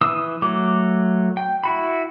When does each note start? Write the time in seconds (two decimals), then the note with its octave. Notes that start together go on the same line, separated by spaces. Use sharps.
0.01 E3 D#6 E6
0.42 F#3 A3 D6
1.37 G5
1.64 E4 F#4 B5